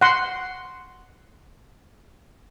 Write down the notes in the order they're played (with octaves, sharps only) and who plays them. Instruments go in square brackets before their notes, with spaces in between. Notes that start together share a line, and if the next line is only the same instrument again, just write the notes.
[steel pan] F#5 C6